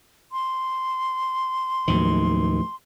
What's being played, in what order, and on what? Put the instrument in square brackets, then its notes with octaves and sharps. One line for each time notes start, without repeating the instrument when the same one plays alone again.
[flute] C6
[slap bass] D#2 D#3 [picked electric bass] A2 F3 F#3